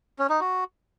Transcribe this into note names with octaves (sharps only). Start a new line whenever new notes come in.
C#4
D#4
F#4